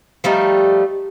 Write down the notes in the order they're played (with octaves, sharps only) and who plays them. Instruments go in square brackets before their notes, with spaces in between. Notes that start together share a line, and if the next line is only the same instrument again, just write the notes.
[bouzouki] F3 G3 A3 D#4